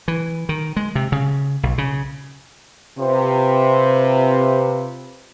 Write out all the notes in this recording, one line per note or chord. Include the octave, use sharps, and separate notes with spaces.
E3
D#3
G#3
C3
C#3
B1
C#3
C3 F4 B4 C5